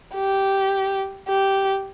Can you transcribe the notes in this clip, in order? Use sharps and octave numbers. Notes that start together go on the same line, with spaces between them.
G4
G4